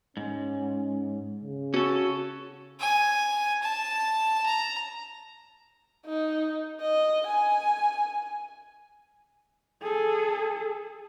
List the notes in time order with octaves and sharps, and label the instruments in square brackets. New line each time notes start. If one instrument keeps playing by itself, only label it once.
[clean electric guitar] G#2 [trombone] C#4
[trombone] C#3
[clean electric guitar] C#4 A4 [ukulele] F#4
[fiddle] G#5
A5
A#5
[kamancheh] D#4
D#5
G#5
[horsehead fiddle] G#4 A4